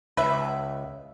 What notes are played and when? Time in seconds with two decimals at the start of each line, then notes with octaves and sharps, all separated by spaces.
0.17 C#2 B4 E5